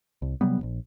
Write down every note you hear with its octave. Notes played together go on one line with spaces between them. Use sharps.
C2
C3 F#3 G3 B3
E1 A#1